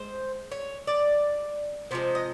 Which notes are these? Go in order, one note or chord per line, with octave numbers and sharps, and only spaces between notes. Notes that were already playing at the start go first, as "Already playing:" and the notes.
Already playing: G#3 C5
C#5
D5
C3 F3 G#3 C5
D#5